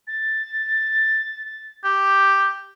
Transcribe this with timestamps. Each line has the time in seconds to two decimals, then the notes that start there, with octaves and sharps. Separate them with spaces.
0.07 A6
1.84 G4